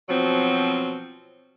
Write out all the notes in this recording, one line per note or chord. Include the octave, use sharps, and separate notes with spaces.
B2 F3 F#3 C4